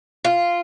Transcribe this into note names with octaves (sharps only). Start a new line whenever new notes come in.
F4